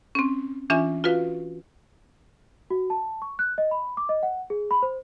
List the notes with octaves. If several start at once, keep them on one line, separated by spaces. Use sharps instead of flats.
C4 C#4
E3 C#4 D4 F4 E5 G#5
F4 F#4 B4 F5
F#4
A5
C#6
F#6
D#5
B5
D6
D#5
F#5
G#4
B5
C5